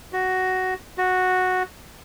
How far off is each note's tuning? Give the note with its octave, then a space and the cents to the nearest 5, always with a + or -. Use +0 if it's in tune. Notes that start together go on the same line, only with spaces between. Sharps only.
F#4 +10
F#4 -5